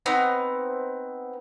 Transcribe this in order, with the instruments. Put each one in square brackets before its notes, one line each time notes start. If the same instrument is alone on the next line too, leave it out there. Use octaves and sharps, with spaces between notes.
[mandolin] B3 C4 D#4 A#5